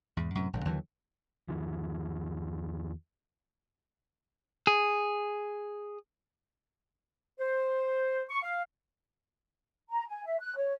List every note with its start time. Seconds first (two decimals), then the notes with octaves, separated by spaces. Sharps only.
0.17 E2 G#2
0.35 F#2 A2 C3
0.53 A#1 G#2 D3
0.65 D#2 D3 E3 F#3
1.49 E2 D#3 F3
4.67 G#4
7.40 C5
8.30 C#6
8.43 F5
9.90 A#5
10.09 G#5
10.25 E5
10.41 F#6
10.56 C#5